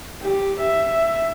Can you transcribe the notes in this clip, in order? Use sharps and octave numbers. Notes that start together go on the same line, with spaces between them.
G4
E5